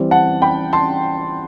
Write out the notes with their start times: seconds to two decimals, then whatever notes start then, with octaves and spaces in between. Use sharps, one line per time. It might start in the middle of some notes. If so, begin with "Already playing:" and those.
Already playing: E3 G3 C4
0.11 F#5 A5
0.42 G5 B5
0.73 A5 C6